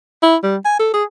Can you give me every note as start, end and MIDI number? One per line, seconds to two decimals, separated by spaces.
0.23 0.36 64
0.43 0.56 55
0.65 0.76 80
0.79 0.89 69
0.94 1.04 68